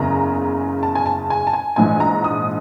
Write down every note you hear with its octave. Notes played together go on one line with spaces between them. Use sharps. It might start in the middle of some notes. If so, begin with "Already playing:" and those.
Already playing: F#1 E2 C#3 A#5
A5
G#5
A5
G#5
A5
G#5
A#1 G#2 E3 G#5
A#5
D#6